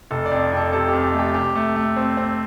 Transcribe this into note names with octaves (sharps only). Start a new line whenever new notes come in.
F1 A4
D5
F2
F2
A4
C3 A4
G4
F2
G4
A3
G4
C3 G4
A3
A3
C4
C4